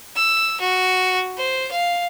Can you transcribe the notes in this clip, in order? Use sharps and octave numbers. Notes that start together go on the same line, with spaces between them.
E6
F#4
C5
F5